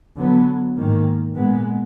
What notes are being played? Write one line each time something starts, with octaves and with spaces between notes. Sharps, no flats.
D3 F#3 B3
G#2 D#3 A#3
A#2 G#3 B3